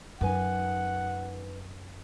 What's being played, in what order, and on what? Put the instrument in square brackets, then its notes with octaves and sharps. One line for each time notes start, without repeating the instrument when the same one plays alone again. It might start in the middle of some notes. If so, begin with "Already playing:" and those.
[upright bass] F#2 [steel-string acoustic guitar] D#4 B4 G#5 [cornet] F#5